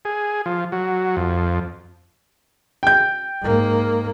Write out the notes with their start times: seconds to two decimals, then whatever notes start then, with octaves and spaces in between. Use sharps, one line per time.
0.05 G#4
0.46 F3
0.72 F#3
1.17 F2
2.83 G5 G6
3.42 G#2 A#3